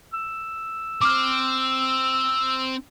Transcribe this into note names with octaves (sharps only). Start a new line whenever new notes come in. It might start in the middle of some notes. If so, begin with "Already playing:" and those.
E6
C4 D6 F6